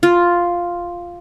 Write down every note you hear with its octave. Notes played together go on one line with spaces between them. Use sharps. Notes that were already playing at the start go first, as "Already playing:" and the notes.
F4